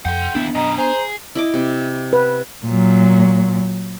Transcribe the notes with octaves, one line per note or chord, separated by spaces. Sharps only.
F2 F#5 G5 C6
D#2 B3 D4 E4
F#2 B2 D#5 A#5
G#4 C5 A#5
E4 D#5 D6
C3
B4
A#2 F#3